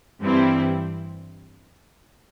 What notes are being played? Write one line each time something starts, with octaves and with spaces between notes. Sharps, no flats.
G2 E3 G3 C4 E4